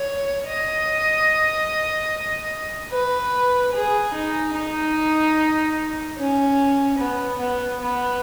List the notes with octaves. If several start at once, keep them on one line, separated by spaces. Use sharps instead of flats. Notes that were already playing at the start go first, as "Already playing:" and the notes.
Already playing: C#5
D#5
B4
G#4
D#4
D#4
C#4
B3
B3
B3